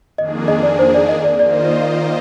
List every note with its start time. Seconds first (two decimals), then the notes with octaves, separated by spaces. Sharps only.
0.18 F2 D#3 A#3 D4 G#4 D#5
0.48 D#5
0.63 D5
0.79 C5
0.94 D5
1.09 D#5
1.24 D5
1.39 D#3 A#3 F4 C5 D5 D#5